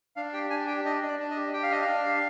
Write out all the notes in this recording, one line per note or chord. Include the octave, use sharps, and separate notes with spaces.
D4 F5
G4 G5
D4 G#5
G4 G5
D4 D#5
D4
D5
D4
D#5
G4
G4 G5
F5
D4 D#5
F5
D4
G4